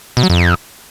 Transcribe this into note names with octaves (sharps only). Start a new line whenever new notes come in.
B2
F#3
F2